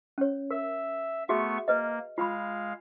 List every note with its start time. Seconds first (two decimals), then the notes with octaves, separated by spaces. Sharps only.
0.18 C#4 C#5
0.51 A#4 E5
1.29 A3 B3 F#4 G#4 E5 C#6
1.68 A#3 B4 D#5
2.18 G#3 F4 F5 B5